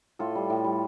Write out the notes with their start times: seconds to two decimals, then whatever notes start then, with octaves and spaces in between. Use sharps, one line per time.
0.19 A2 F4 A4
0.35 G3
0.50 A2
0.64 G3